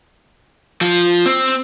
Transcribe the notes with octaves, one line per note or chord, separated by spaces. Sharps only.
F3
C4